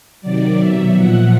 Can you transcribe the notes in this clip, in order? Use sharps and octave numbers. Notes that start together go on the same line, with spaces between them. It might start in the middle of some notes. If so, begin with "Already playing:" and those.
C3 D#3 F#3 D5
B2 F#3 E5
A#2 F3 F#5